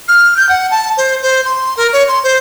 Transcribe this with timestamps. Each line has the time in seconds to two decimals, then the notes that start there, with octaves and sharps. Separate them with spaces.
0.08 F6
0.37 G6
0.49 F#5
0.71 A5
0.97 C5
1.22 C5
1.45 C6
1.77 A#4
1.93 C#5
2.08 C6
2.24 C5